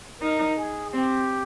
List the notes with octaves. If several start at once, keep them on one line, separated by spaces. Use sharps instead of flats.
D#4 A#4
G#4
C4 G4